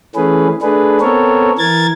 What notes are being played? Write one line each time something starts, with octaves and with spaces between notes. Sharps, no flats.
E3 A3 C#4 G#4 B4
A3 D4 G#4 B4
B3 C4 A4 A#4 C#5
E3 A#4 G#6 A6